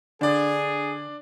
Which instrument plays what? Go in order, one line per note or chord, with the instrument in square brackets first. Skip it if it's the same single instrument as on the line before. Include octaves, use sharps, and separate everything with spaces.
[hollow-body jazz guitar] D3 [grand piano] D4 D5 [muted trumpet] G#4